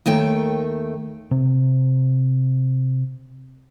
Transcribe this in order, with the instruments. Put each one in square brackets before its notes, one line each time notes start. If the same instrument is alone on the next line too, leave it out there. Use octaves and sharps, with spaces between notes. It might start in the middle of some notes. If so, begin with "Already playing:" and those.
[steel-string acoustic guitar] D#2 D#3 A3 G5
[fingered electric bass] C3 C4